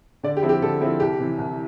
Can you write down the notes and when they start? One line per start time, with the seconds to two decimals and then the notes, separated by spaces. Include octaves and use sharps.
0.23 D3 D5
0.37 G4
0.43 F3 C4 E4
0.49 G4
0.62 D3 A4
0.81 F3 C4 E4
1.00 C2 G4
1.20 C3 E3
1.38 C2